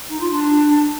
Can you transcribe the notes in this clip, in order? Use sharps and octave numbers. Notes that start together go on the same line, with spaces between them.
D#4
F4
D4